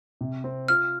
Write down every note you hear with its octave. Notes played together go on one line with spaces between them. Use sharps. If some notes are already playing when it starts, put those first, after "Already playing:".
C3
C4
F4 F6